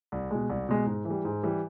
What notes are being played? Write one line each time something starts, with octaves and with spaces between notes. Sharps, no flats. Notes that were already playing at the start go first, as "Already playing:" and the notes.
C2
B2 G#3
C2
B2 G#3
G#2
E3
G3
G#2
E3 G3